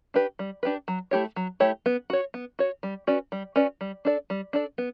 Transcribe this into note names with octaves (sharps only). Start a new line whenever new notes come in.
D4 G4 B4
G3
D4 G4 B4
F#3
A3 E4 G4 C#5
F#3
A3 E4 G4 C#5
B3
F#4 C#5
B3
F#4 C#5
G3
C#4 F#4 B4 D5
G3
C#4 F#4 B4 D5
G3
D4 A4 D5
G3
D4 A4 D5
B3